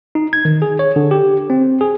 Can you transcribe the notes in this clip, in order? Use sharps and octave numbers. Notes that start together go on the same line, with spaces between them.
D#4
G#6
D#3
G#4
C#5
D3
G4
C4
G#4